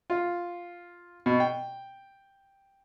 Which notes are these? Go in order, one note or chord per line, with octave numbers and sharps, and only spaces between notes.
F4
B2
G5